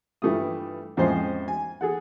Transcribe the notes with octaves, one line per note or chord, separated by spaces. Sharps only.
G2 E3 F3 A3 G4 D#6
F2 A2 G#3 C#4 C5
G#5
G#4 A4 F#5